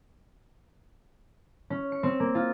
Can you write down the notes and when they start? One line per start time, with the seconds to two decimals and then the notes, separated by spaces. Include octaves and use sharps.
1.70 C#4
1.92 C#7
2.03 C4
2.20 A#3
2.35 F4